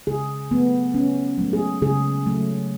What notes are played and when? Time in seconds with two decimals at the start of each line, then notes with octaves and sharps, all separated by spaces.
0.07 C#3 G#4
0.51 F#3 A3 B3
0.94 C#3 C#4
1.38 F#3 A3
1.53 G#4
1.82 C#3 G#4
2.26 F#3 A3